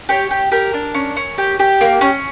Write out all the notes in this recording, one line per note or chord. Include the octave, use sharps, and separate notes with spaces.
G4 C#5
G4
G4 A#4
D4
C#4
C#4
G4
G4
A#3
C#4